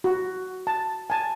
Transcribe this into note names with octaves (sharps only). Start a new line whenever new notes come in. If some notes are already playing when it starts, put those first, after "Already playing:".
F#4
A5
G#5 A5